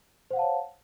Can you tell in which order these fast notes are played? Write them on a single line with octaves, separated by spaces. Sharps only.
C5 F#5 F5 A5 C#5